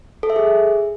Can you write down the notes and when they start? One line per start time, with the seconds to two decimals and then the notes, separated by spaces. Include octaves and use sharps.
0.23 A4
0.30 E5
0.36 G#4